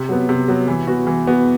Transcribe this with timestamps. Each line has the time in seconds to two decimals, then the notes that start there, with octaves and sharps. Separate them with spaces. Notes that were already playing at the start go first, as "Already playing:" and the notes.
Already playing: C3
0.09 F#3 B3
0.29 C3
0.48 F#3 B3
0.68 E3
0.87 B3 F#4
1.07 E3
1.27 B3 F#4